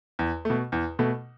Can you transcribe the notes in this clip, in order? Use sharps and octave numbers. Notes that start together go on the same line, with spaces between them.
E2
B2 A3
E2
B2 A3